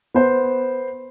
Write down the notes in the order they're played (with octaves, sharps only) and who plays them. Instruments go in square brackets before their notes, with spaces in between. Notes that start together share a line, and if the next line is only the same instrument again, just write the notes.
[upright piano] B3 C5